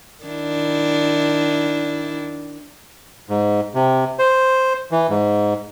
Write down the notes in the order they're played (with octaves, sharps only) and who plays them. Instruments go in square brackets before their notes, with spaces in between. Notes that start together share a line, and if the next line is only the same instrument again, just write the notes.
[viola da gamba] D#3 D4 E4
[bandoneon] G#2
C3
C5
E3
G#2